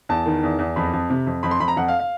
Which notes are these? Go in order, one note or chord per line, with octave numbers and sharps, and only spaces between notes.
E2 A5
D#3
E2
E2
F2 B5
F2
C3
F2
F2 B5
C6
F2 B5
A#5
F2 F#5
F5
F5